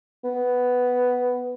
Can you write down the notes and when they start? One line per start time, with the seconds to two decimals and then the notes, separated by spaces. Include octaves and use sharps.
0.24 B3